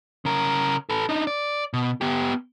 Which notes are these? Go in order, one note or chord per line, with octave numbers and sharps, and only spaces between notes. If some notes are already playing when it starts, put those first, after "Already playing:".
C#3 A#4
A4 B4
D4 D#4
D5
B2
B3 G4